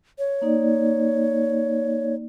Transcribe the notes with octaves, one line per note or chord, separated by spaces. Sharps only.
C#5
A#3 D#4 D5